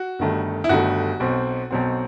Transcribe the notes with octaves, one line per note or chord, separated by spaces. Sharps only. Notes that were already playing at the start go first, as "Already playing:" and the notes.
Already playing: F#4
G1 G2 D#3 A3
E4
G1 G2 D#3 A3 F#4
B1 B2 F#3 C4
B1 B2 F#3 C4